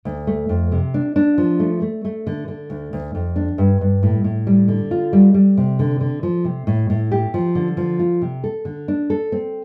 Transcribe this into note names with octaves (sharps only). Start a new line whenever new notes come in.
D2
A3
F2
C3
D4
D4
F3
A3
A3
A3
D3
D3
D2
D2
F2
D4
G2
G2
A2
A2
G3
D3
F4
G3
G3
C3
D3
D3
F3
C3
A2
A2
G4
F3
D3
F3
F4
C3
A4
D3
D4
A4
C4